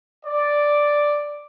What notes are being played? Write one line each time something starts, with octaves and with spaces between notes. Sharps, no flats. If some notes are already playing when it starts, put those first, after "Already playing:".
D5